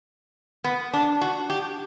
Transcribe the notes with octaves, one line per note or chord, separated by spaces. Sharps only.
B3
D4
F#4
G4